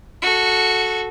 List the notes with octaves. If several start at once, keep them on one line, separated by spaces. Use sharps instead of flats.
F#4 A4